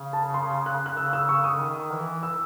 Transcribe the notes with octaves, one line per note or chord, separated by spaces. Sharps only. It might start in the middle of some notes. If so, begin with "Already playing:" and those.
Already playing: C#3
A5
C6
F#6
F#6
C#3 E6
E6
C#3 C#6
D#6
D#3
E3
E6